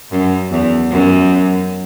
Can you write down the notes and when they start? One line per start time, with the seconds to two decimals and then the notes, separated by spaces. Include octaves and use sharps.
0.11 F#2
0.51 E2
0.91 F#2